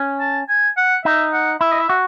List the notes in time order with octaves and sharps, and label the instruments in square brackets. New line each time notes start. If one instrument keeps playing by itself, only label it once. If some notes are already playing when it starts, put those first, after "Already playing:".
Already playing: [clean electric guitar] C#4
[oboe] A5
G#5
F#5
[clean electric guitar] D#4 [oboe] E5
[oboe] F#5
[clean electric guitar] E4 [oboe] E5
[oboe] D#5
E5
[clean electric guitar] F#4